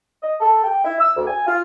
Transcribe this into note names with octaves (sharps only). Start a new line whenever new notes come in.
D#5
A4
G5
E4
E6
D2
G#5
F4